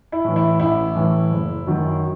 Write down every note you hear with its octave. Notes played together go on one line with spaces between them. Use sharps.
E4
A2 E3
E4
A1 E4
A2 E3
F#1
F#2 D#3 F#3